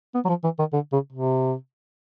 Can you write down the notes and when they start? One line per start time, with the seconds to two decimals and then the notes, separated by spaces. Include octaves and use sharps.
0.15 B3
0.25 F#3
0.29 F3
0.44 E3
0.59 D#3
0.73 D3
0.92 C#3
1.13 C3